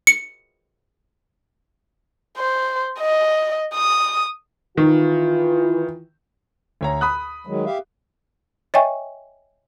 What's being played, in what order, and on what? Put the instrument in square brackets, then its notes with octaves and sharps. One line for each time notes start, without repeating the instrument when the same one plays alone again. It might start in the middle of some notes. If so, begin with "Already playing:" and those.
[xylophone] C#7
[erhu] C5
D#5
D#6
[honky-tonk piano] D#3 [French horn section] E3 F4
[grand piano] D2 C#5 A#5
B5 D#6 F#6
[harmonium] D#3 F#3 G#3
G4 E5 F5
[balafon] C#5 D#5 E5 G5 G#5 C#6